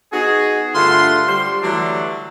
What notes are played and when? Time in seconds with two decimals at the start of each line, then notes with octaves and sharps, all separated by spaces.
0.13 B3 D#4 F#4 G#4
0.74 G2 D3 A3 F4 F#5 C6
1.28 G3 C6
1.63 D3 E3 F#3 G3 A3 D4